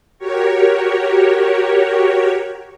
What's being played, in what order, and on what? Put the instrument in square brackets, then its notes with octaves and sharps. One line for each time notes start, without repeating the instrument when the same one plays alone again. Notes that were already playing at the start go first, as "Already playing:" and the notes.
[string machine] F#4 G4 A#4 C#5